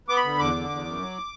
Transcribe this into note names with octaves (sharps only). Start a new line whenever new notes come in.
B3 D6
B5
D3
E2 D6
D3
E2
F#2
F#3